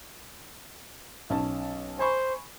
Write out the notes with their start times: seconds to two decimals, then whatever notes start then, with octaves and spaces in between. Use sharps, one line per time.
1.30 B1 C#4 A5
1.99 C5 G#5 B5 C#6